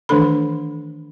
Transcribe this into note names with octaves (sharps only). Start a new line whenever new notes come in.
D#3 E3 A3 D4 A4 B5